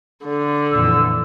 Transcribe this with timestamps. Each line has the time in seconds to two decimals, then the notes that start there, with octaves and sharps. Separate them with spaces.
0.24 D3
0.73 F2 A#2 E3 E6